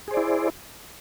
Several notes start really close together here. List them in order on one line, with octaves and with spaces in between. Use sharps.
G#4 C5 D5 E4